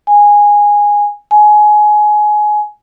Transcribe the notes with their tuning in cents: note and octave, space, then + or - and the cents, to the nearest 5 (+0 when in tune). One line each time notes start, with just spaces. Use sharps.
G#5 -10
G#5 +20